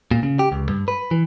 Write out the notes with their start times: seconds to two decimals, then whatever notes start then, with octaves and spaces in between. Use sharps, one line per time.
0.11 A#2
0.23 C#3
0.39 G4
0.52 C#2
0.69 G2
0.88 B4
1.11 E3